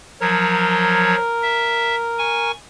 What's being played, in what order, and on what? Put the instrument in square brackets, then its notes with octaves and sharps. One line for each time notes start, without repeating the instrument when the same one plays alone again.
[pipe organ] F3 F#3 C#5 [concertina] A#4
[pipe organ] E5
G#5 C#6